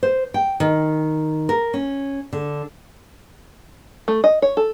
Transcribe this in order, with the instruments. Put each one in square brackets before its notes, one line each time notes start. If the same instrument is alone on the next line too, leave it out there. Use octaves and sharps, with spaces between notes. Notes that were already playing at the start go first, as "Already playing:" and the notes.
[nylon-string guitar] C5
G5
D#3
A#4
C#4
D3
[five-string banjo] A3
D#5
C#5
A4